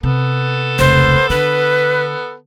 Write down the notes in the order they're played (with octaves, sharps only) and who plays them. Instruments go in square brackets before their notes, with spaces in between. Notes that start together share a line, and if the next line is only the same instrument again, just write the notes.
[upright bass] C3 [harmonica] B3 A4
[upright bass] F1 C#2 [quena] C5
[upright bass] D3 [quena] B4